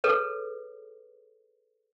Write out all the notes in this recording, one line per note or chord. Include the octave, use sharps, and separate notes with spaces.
G#4 A4 B4 C#5